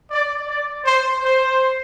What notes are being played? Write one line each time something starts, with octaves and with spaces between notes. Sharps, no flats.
D5
D5
C5
C5